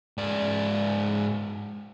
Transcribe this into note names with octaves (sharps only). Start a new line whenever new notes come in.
G#2 D5